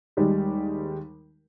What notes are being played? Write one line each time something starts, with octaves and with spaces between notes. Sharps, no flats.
D#2 G3 G#3